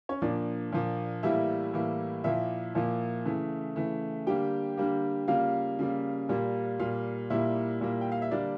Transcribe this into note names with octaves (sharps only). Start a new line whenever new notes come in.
C#4 C#5
A#2 F3 A#3 D4 D5
A#2 F3 A#3
A2 E3 G3 A#3 E4 E5
A2 E3 G3 A#3
A#2 F3 A#3 E4 E5
A#2 F3 A#3
C#3 E3 A3
C#3 E3 A3
D3 G3 A#3 G4 G5
D3 G3 A#3
C#3 G3 A#3 F4 F5
C#3 G3 A#3
A#2 G3 A#3
A#2 G3 A#3 F4 F5
A#2 G3 A#3 E4 E5
A#2 G3 A#3
G5
F5
E5
D3 G3 A#3 D4 D5